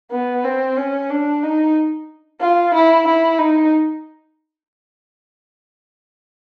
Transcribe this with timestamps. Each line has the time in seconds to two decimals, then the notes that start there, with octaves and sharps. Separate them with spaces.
0.12 B3
0.44 C4
0.77 C#4
1.10 D4
1.43 D#4
2.41 F4
2.74 E4
3.07 E4
3.38 D#4